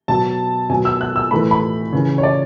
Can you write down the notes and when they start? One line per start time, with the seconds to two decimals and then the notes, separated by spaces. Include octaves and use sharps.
0.08 B2 F#3 A5
0.70 B2 G#5
0.73 F#3
0.85 E6
1.01 F#6
1.16 E6
1.31 A2 E3 B5
1.51 B5
1.93 C#3 E3
2.18 C#5
2.23 D5